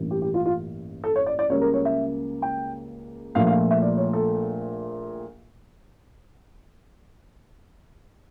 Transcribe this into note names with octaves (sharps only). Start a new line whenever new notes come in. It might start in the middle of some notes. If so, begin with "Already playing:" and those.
Already playing: A1 G2 E3 A#3
G4
G4
F4
F4
A4
C#5
D5
D5
C#2 C#3 G3 A#3 C#5
A#4
C#5
E5
G5
A#1 A#2 F3 A3 F5
F5
E5
D5
C#5
A4